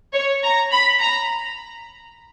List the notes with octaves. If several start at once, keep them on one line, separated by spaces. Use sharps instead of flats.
C#5
A#5
B5
A#5